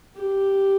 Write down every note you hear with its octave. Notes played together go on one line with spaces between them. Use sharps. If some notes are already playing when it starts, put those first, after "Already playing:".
G4